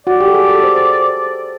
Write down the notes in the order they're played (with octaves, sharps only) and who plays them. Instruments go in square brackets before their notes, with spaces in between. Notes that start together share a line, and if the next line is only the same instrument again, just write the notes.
[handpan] F#4 [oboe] D5
[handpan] G4
A4
G#4
A4
C5